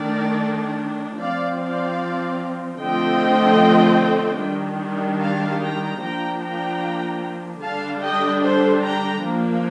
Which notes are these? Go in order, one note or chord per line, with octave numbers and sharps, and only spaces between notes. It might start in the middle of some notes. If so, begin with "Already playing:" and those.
Already playing: D#3 A3 D4 A#4 D5
F3 C4 D5 F5
D5 F5
D3 F3 A3 C4 D#5 G5
D#3 G3 D4
F5 A5
G5 A#5
F3 A#3 D4 G5 A#5
G5 A#5
D3 G3 D4 F5 A5
D#5 G5
A4 C5
G5 A#5
F3 A#3 D4